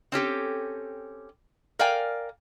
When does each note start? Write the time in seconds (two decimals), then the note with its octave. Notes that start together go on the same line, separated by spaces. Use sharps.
0.12 C4 C#4 G4 A4
1.79 A#4 D5 F5 G5 G#5